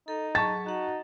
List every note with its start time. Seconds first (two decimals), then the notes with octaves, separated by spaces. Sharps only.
0.08 D#4 A4
0.35 F#3 G#4 A5 C#6 A6
0.66 D#4 F#4 F#5